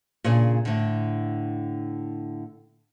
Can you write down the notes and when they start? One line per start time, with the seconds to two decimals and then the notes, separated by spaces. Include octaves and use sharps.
0.24 A#2 C#3 D4 G#4
0.65 A2 D3